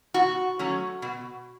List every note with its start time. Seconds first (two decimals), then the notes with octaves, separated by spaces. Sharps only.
0.14 B2 F#4
0.59 F#3 A3 C#4
1.02 B2